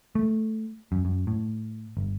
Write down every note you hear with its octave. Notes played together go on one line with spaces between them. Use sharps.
A3
F#2
F#2
A2
G1